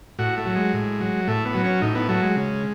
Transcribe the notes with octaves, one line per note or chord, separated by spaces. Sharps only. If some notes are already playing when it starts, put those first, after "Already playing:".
A2 F#4
A3
F#3
G#3
A2
F#3
A2 A3
B3
F#3
C#4
A2 D#4
B3
F#3 A3
G#3
C#3